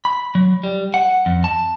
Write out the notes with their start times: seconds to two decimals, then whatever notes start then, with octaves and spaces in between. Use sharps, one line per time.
0.05 B5
0.35 F#3
0.64 G3
0.94 F#5
1.26 F2
1.44 A5